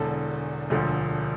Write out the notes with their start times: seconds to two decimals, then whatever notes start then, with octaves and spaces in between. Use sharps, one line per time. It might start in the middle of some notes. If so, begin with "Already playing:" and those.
Already playing: E1 E2 D3 A4
0.70 E1 D2 D3 F3 A3